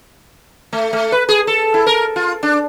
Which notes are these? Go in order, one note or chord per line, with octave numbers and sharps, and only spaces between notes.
A3
A3
B4
G#4
A4
E4
A#4
F4
D4